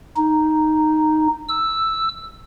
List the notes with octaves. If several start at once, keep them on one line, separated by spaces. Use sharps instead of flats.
D#4
E6